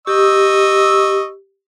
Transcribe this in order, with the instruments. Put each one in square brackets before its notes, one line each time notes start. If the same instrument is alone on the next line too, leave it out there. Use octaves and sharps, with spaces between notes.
[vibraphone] G4 [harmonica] D#5 C#6 E6